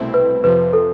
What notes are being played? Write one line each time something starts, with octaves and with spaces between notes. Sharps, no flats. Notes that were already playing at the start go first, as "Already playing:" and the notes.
Already playing: C2 B2 A3 C4 E4
B4
F2 C3 F3 B4
A4